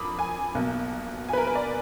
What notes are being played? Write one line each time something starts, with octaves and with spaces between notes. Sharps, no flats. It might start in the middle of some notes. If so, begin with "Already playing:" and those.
Already playing: F2 B5 D6 D#6
G#5
B1 B2 A#3
G#5
B4
A#4
B4
D5